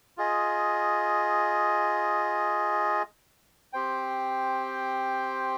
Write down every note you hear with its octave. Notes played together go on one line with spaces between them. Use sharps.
F4 G#4 D#5
C4 G4 C5 G5